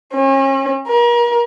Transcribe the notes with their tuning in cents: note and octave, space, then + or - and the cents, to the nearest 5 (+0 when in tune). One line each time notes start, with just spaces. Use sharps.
C#4 -40
A#4 +35